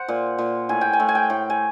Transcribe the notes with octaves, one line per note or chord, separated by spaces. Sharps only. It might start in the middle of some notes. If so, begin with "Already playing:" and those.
Already playing: C5 F#5
A#2
A#2
A2 G#5
G5
G#5
A2
G#5
G5
A2
G#5